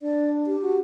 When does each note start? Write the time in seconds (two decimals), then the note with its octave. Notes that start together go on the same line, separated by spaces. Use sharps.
0.01 D4 D5
0.47 G4
0.62 F#4